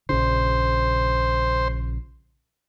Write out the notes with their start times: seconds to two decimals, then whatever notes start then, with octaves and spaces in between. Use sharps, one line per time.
0.09 A#1 C#3 C5